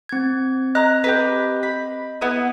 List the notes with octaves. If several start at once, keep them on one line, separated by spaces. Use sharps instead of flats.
C4 G#6
D#5 A#5 F#6
G4 G#4 B4
B5
B3 E4 D#6